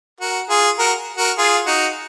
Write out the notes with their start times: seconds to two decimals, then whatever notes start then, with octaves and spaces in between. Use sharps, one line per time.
0.20 F#4 A#4
0.49 F4 G#4
0.79 F#4 A#4
1.18 F#4 A#4
1.38 F4 G#4
1.67 D#4 F#4